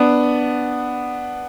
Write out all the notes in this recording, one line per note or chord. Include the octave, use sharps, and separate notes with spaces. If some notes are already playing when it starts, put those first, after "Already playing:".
Already playing: B3 D4